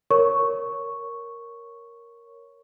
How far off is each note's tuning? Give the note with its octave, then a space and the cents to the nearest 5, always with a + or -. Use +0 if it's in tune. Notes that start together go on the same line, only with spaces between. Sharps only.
A#4 +0 C#5 +0 C#6 +0